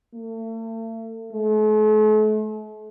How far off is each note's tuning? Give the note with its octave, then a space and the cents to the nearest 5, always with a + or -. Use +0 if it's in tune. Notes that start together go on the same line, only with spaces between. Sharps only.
A3 +40
A3 -45